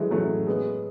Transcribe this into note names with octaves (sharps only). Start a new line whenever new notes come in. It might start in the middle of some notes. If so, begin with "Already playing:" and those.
Already playing: E3 F#3 G#3 A3
F#3 A3
G#3 B3